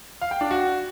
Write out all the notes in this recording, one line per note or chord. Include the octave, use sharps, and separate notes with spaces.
F5
G5
D4
F#4